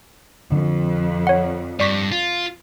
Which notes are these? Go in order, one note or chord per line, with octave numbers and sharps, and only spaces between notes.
F2 D3
C#5 F#5
G2 D5 C#6 B6
F4